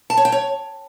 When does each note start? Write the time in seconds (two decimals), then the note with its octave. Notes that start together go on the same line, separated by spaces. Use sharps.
0.10 A5
0.17 C#5
0.25 G5
0.32 C#5